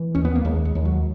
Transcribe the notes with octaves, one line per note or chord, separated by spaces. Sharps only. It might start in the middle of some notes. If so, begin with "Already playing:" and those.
Already playing: E3
D#2 C#4
B3
A#3
D#2 G#3
G#3
D#2
F#3